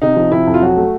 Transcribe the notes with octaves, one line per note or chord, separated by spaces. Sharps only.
C3 D#4
F3
C3 E4
F2
F4
F#3 F#4
A3